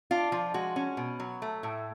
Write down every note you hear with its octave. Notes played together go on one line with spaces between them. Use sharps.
D4 F4
F3 F4
G#3 F#4
C#4
B2
F#3
A3
A2